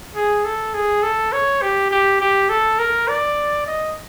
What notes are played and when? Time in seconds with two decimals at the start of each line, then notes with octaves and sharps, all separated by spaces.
0.15 G#4
0.45 A4
0.74 G#4
1.03 A4
1.32 C#5
1.62 G4
1.91 G4
2.20 G4
2.49 A4
2.79 A#4
3.08 D5
3.67 D#5